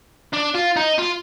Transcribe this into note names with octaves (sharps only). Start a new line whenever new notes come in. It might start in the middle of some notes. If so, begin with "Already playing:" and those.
D4
F4
D#4
F4